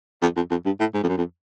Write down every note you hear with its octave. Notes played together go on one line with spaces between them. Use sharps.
F2
F2
F2
G2
A2
G#2
F2
F#2
F2